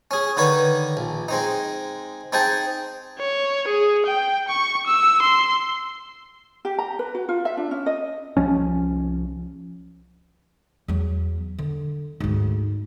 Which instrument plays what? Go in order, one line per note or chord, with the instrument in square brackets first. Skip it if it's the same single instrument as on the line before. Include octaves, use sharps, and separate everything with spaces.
[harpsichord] C#4 G#4
D3 D#3 D#4 B4 C#5 B5
A#1
G#3 C4 D#4
C4 D#4 G#4 G5 A5
[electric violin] C#5
G#4
G5
C#6
E6
C6
[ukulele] G4
A#5
B4
F#4
F4
E5
D4
C#4
D#5
[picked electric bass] C2 F3 C#4
[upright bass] E2 F#3
D3
D2 G#2